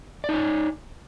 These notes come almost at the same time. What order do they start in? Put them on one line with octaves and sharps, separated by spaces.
D5 D#4 C#5